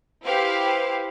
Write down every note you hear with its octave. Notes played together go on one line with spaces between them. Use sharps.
E4 G4 B4 C5 F5